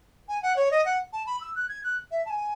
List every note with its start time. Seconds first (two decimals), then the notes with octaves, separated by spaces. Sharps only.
0.28 G#5
0.43 F#5
0.56 C#5
0.71 D#5
0.85 F#5
1.13 A5
1.27 B5
1.41 E6
1.55 F#6
1.69 G#6
1.84 F#6
2.11 E5
2.25 A5
2.30 G#5